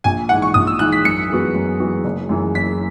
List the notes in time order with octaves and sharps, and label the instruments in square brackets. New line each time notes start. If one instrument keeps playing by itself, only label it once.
[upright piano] A#1 [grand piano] G#5
[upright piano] G#2 E3 [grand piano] F#5
[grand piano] C#6
[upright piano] A#1 [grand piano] D#6
[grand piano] E6
[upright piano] G#2 E3 [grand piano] F#6
[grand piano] B6
[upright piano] F#2 [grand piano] C#7
[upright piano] E3 G#3 B3 F#4
F#2
E3 G#3 B3 F#4
F#1
F#2 C#3 E3
[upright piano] F#1 [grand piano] B6